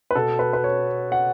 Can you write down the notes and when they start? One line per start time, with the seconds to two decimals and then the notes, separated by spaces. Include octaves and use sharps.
0.11 B4
0.15 B2 A4
0.39 B4
0.53 B4
0.64 C#5
1.12 F#5